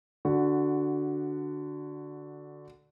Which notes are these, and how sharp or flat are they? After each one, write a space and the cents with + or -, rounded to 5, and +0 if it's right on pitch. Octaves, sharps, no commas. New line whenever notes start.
D3 +0 F#4 +0